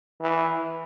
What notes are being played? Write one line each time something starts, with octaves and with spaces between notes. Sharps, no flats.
E3